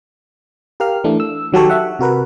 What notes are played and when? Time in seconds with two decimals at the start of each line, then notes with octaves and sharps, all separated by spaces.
0.80 G4 A#4 F5 F6
1.04 E3 A3 D4
1.20 E6
1.52 D#3 F#3 G4 A4 C#5
1.70 E5 F#5
1.99 C3 F#4 A#4 B4